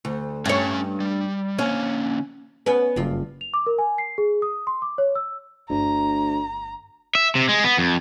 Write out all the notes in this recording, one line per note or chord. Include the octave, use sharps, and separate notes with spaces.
D2
G2 C#4 C#5 E5 G#5
G3
D3 A#3 C#4
B3 C#4 B4
F#1 G2 F4
F7
D6
A#4
G#5
C7
G#4
D#6
C6
D6
C#5
E6
G1 D2 A#5
E5
C3
G#3
B3
F2